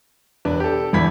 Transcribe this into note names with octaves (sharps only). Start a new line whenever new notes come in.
E1 D4 B4
G4 A4
G1 E2 E3 B5 G#6 B6